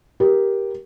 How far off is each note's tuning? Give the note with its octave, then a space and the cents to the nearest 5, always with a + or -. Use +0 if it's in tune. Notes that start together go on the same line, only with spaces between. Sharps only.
G4 +0 A#4 +15